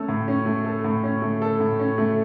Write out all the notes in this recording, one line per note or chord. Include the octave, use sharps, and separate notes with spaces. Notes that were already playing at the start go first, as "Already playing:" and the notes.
Already playing: A3 C#4 A4
A2
C#4
A3
A4
A2
C#4
A3
A4
A2
C#4
A3